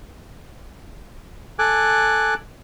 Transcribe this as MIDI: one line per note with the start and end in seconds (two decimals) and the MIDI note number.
1.59 2.34 69
1.59 2.34 80
1.59 2.34 86
1.59 2.34 90